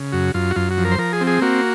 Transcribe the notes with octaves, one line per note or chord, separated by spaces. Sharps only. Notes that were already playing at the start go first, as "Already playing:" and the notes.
Already playing: C#3
F#2 F#4
F#2 F4
F#4
F#2 F4
F#4
F3
A#4
C5
F3 A#4
G#4
C4
G#4
A#3 F#4